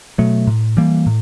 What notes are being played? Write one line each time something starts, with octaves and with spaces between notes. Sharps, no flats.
B2 F#3 A3
A2
E3 G3 A#3
A2